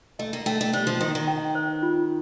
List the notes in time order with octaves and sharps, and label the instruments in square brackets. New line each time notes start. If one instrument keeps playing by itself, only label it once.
[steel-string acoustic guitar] A3 [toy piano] D#5
[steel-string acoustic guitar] A#3
[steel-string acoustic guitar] A3 [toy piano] G5
[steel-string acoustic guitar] A3
[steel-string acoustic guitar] G3 [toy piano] C5
[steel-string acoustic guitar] F3
[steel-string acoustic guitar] D#3 [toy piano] D#5
[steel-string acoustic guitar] D#3
[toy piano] G5
C5
F4